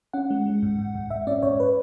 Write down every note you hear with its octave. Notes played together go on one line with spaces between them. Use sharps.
C#4 F#5
G#3
G#3
G#2
G#2
G#2
G#2 E5
C#4 D5
G#2 C#5
B4